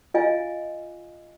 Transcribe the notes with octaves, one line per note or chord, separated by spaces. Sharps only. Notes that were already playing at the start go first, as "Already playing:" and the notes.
F4 D#5 F5 G#5